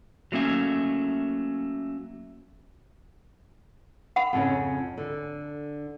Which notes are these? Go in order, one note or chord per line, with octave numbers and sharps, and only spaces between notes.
F#3 A3 A#3 C#4 E5
F#5 B5
F2 C#3 C#4
D3